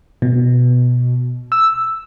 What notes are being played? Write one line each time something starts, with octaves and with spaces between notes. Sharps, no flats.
B2
E6